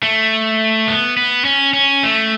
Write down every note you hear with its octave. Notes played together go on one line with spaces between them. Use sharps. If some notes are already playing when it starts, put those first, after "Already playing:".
A3
B3
B3
C#4
C#4
A3